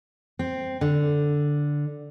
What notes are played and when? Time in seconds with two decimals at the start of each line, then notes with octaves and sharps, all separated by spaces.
0.39 C4
0.81 D3